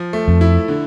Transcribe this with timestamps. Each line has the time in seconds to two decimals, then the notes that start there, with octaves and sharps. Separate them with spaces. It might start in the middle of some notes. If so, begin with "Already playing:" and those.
Already playing: F3
0.13 A3
0.28 F2
0.41 E4
0.68 D3